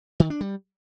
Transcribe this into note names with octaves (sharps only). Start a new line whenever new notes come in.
D#3
D4
G3